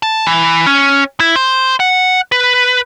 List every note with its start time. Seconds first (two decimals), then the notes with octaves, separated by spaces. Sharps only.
0.03 A5
0.27 E3
0.66 C#4
1.20 E4
1.36 C5
1.80 F#5
2.32 B4